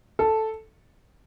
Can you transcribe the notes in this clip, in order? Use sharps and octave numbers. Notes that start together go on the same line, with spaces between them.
A4